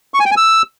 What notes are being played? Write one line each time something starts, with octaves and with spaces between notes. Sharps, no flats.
C#6
G#5
G5
G#5
E6